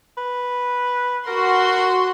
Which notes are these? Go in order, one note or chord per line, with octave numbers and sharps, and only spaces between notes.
B4
F#4 A#4 C6